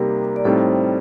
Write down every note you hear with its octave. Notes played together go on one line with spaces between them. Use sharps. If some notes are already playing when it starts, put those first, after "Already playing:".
Already playing: C3 G3 A#3 D#4 G4 A#4
D5
A2 G3 C4 D#4 A4 C5